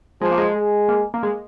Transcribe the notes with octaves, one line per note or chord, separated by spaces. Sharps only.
F3 G#3
A#3
G#3
G#3
A#3
A#3
G#3